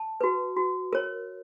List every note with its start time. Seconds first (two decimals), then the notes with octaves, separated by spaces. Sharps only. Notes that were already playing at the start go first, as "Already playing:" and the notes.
Already playing: A5
0.21 F#4 B4
0.57 F#4
0.93 A#4 C#5